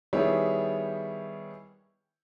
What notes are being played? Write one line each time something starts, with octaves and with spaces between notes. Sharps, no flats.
D#3 G3 B3 E4 G#4 C#5